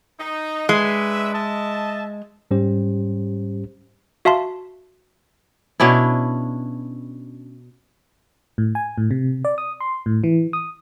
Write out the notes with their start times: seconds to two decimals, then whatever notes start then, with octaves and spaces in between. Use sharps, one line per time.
0.19 D#4
0.69 G#3 D4 B4 E5
1.34 D#5 E5 A5
2.51 G#2 G3 C#4 G4 C5
4.25 F#4 E5 F5 A5 C6
5.80 B2 C#4 D4 E4
8.58 A2
8.75 G#5
8.98 A2
9.11 C3
9.45 D5
9.58 D#6
9.80 C6
10.06 A2
10.24 E3
10.53 D#6